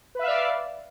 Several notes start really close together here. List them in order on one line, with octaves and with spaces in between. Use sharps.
B4 E5 F5 D5